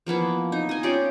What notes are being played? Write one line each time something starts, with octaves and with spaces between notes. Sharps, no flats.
F3 A#3 B3 E4
D#4
D#5 G#5
C#4 F4 G4 D5